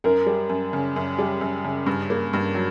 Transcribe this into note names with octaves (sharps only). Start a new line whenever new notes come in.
F#2 A#4
G3
F#2
C#3
F#2
G3
F#2
C#3
G2
A#3
G2
F#3